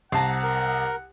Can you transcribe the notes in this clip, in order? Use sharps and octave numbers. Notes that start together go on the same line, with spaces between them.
C2 C5 F#5 A5 A#5
A#4